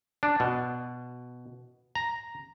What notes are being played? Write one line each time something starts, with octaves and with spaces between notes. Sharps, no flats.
D4
B2
A#5